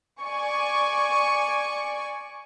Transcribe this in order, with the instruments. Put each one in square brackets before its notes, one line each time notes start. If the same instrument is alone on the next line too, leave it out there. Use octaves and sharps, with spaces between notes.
[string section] D5 G#5 C#6